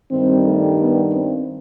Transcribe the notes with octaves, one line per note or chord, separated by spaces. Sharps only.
G2 D#3 G3 C4
A3
B3
C4